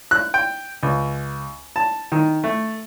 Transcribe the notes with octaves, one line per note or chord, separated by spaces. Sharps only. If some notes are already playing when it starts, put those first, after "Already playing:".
F#6
G5
C#2
A5
D#3
A3